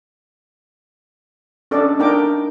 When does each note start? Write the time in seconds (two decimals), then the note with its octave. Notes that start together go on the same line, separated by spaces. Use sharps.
1.71 C#4 D4 A4 D5 D#5
1.99 D4 D#4 A#4 G5 D6